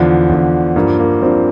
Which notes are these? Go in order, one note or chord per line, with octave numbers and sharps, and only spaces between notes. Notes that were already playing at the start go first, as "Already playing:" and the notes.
Already playing: E2 D3 F3
E2 D3 F3
G2 F3 A#3
A#3
G2 F3 C4